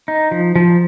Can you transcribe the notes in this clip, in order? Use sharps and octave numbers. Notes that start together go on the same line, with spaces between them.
D#4
F3
F3